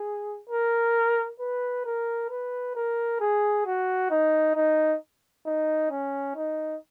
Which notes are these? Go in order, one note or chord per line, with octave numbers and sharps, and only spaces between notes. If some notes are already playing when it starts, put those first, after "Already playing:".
Already playing: G#4
A#4
B4
A#4
B4
A#4
G#4
F#4
D#4
D#4
D#4
C#4
D#4